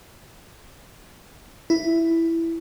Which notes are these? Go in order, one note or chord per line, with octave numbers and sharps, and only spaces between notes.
E4